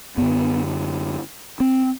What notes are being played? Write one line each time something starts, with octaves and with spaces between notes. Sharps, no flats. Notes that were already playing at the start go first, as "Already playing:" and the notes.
F#2 D3 B3
C4